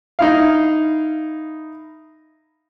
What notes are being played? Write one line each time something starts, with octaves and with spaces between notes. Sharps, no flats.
D#4 E4 F5